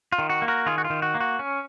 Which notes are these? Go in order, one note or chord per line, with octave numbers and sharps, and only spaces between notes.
F4
D#3
F#4
A#3
F#4 A#4
D#3 F4 G#4
F#4
F4
D#3
F#4
A#3
F#4
C#4